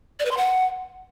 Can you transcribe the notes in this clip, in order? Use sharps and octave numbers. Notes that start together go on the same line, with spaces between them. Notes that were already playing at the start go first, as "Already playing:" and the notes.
D5
B4
C6
F#5